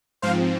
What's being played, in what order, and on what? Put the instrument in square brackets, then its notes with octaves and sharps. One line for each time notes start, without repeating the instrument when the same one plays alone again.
[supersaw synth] G#2 F3 C4 C5 F5